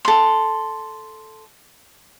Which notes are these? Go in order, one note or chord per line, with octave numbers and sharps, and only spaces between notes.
A4 C6